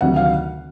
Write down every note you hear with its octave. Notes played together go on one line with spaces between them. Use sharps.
D2 C3 D#3 F#3 F#5
F5